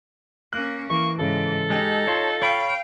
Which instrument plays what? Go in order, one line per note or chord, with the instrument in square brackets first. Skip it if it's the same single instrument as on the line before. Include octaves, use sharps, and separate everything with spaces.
[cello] A#3 C#4 [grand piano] F#6
[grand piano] E3 [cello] A#3 [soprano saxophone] C#6
[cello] G#2 G#3 [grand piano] C#3 E3 [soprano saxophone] A4
[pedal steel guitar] G#3 G4 [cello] D#4
[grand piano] F4 A6 [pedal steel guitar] C#5 A5 C6
[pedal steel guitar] C#5 B5 C#6 [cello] F5 G5